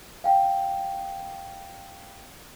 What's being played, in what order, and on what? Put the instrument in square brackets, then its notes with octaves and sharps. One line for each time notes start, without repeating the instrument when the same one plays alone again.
[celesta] F5 G5